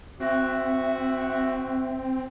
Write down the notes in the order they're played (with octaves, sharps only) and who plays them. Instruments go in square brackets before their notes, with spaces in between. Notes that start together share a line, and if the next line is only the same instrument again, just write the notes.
[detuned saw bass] C4 [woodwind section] F#4 E5